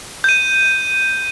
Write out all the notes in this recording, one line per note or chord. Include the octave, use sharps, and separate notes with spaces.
G6 D#7